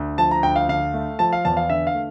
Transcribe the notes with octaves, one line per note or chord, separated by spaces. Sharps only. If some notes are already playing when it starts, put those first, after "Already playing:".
Already playing: D2
F3 A5
A#5
D2 G5
F5
D3 F5
A3
F3 A5
F5
E2 A5
F5
D3 E5
F5
A3